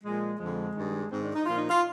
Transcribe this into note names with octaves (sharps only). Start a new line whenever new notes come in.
A#2 F3 G#3
F2 D3 F3 G#3
G2 D#3
G#2 D#3 C4
D4
D#4
A#2 F3 F4
D#4
F4